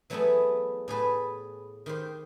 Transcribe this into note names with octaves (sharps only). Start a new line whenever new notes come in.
E3 F#3 A3 B3 E4 G#4
A2 G#4 B4 A5
D#3 G4 C5